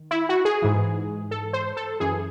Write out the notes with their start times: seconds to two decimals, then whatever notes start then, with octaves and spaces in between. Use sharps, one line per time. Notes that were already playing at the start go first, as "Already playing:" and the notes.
Already playing: D#3
0.11 E4
0.29 F#4
0.45 G#4
0.62 G#2 E3
1.31 A4
1.53 C5
1.77 A4
2.00 F#2 E3 G#4